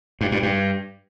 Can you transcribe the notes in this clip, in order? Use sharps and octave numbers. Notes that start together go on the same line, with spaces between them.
G2
G2
G2